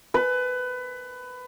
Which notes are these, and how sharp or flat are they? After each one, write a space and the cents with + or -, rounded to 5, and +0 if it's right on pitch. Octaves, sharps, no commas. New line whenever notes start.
B4 +20